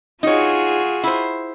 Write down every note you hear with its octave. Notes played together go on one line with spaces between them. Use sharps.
D#4 F4 F#4 G#4 C#5
E4 C5